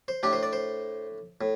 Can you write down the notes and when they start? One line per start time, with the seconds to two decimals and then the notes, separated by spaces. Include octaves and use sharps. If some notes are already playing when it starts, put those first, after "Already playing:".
0.08 C5
0.23 A2 A3 D4 G4
0.33 C5
0.43 D5
0.53 C5
1.41 A2